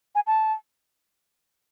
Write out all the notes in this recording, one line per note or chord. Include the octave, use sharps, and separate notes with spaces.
G#5
A5